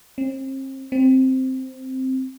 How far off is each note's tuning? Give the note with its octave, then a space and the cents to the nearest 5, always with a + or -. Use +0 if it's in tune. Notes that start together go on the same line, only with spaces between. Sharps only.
C4 +40
C4 +0